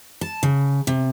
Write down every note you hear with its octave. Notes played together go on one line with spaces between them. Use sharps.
A5
C#3
C3